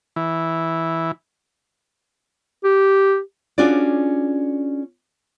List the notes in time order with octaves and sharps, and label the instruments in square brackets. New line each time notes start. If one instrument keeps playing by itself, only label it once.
[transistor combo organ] E3
[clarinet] G4
[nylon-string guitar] C#4 D4 F4 F#4 G#4 D5